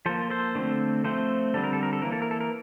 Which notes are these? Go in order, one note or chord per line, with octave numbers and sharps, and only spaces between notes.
F3 A#3 A4 C5
A4 C5
D3 A3 C4
F3 A3 C4 A4 C5
D3 G3 C4 A4
A#4
A4
A#4
A4
E3 A#3 A#4
A4
A#4
A4
A#4